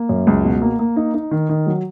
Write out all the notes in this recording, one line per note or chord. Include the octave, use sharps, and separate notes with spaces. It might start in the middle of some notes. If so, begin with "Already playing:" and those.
Already playing: A#3
F#2
C#2
B2
A#3
A#3
D#4
D#4
D#3
D#3
F#3